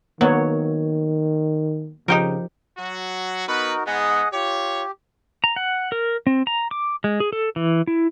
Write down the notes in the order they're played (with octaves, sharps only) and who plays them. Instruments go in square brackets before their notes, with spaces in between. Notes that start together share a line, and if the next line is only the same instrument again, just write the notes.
[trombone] D#3 [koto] F#3 [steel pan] A#3 B3 C#5
[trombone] C#3 [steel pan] F3 [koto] D#4 G4 A#4
[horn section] F#3 F#4
[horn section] B3 B4 [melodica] D#4 F#4 A#4
[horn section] G#2 B3 [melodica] G#4 D#5 F#5
[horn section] F4 C#5 [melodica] G4
[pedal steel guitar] A#5
F#5
A#4
C4
A#5
D6
G#3
G#4
A4
E3
E4